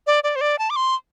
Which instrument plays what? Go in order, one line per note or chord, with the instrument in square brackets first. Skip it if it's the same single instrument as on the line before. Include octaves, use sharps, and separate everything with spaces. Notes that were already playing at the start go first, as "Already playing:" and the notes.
[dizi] D5
D5
C5
D5
A5
D6
C6